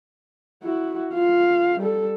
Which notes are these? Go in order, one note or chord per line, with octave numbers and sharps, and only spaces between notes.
E4 F#4
F4 F5
G3 A4